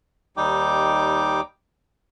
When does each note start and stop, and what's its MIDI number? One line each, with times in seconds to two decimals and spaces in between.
0.37 1.41 39
0.37 1.41 55
0.37 1.41 63
0.37 1.41 79
0.37 1.41 86